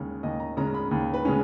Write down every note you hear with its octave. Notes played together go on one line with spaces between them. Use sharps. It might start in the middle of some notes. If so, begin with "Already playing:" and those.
Already playing: D#2 C#3 G#3 C#4
D#2 D#5
A#5
C#3 G#3 C#4 A#5
B5
D#2
B4
C#3 G#3 C#4